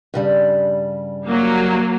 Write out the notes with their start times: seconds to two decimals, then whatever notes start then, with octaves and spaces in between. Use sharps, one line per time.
0.14 G2 C#3 G3
1.27 F#3 A#3